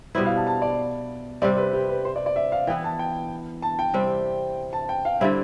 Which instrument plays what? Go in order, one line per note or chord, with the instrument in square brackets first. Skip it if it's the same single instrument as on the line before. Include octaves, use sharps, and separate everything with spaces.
[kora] B2 G3 B3 E4 [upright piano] C5
[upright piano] F5
A5
A5
D5
[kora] C3 G3 C4 [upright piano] D5
[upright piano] B4
G4
B4
C5
D5
D5
E5
F5
[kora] E3 B3 E4 [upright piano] G5
[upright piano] A5
G5
A5
G5
[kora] C3 G3 C4
[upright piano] A5
G5
F5
[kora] D3 G3 C4 E4 [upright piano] E5